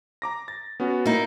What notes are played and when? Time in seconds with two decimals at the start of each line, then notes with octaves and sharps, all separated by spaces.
0.22 A#5 D6 A#6
0.48 A6
0.80 B3 C#4 F#4
1.06 A#3 D#4 E4